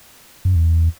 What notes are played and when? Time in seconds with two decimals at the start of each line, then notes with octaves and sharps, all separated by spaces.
0.45 F#2
0.56 E2